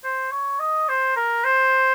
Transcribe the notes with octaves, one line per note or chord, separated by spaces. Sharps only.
C5
C#5
D#5
C5
A#4
C5